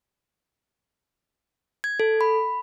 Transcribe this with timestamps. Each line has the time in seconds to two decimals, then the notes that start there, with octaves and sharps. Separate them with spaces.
1.84 G#6
2.00 A4
2.21 B5